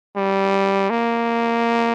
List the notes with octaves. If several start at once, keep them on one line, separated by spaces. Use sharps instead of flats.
G3
A#3